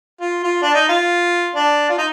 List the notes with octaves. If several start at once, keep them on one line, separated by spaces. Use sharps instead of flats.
F4
F4
D4
D#4
F4
D4
F4
D#4